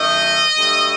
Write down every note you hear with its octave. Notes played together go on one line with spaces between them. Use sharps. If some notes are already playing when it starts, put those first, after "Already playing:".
Already playing: F#2 D#3 A3 D#5
G2 D3 F#3 A3